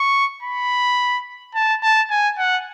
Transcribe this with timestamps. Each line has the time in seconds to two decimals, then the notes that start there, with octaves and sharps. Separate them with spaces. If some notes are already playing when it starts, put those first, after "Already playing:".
Already playing: C#6
0.43 B5
1.55 A5
1.83 A5
2.10 G#5
2.38 F#5